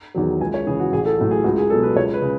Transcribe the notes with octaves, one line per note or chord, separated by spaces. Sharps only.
E2 D#3 F#3
C#2 G#5
C#5
C#3 E3 G#4
F#4
A1 G#4
A4
A2 F#3
G#4
C#2 F#4
G#4
B2 F#3 A4
B4
C#2 C#5
B4
C#3